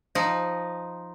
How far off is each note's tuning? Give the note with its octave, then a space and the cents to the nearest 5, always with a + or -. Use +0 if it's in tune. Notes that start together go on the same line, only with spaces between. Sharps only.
F3 +0 D#4 +0